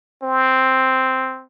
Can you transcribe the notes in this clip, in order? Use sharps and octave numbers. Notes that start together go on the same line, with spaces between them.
C4